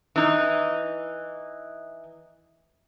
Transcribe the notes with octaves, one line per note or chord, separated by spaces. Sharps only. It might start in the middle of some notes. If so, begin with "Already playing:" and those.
E3 D#4